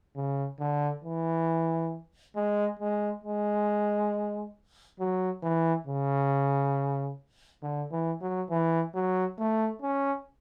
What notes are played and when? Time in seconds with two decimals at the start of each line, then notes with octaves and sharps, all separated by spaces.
0.16 C#3
0.60 D3
1.04 E3
2.36 G#3
2.79 G#3
3.24 G#3
4.99 F#3
5.43 E3
5.87 C#3
7.62 D3
7.91 E3
8.21 F#3
8.50 E3
8.94 F#3
9.38 A3
9.82 C#4